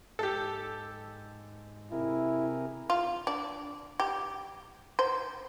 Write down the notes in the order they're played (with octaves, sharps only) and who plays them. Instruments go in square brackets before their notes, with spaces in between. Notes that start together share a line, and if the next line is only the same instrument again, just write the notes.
[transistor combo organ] G#2 [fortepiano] G4 A4
[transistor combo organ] C3 G#4 A#4 [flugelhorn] E4
[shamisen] F4
D4
G4
C5